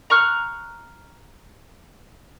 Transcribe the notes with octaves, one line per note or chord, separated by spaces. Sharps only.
A#5 C#6 F6 F#6